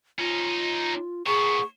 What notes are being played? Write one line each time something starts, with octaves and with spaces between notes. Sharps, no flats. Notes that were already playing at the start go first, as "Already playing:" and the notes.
C#4 D#4 F4
A#2 B3 G#4 C#6